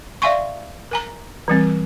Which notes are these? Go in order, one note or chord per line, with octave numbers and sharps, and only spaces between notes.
D5 E5 F5 G#5 C6 C#6
A#4 G#5 A#5
E3 G3 C4